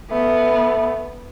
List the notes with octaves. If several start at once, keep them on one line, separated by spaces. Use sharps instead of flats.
A3 B3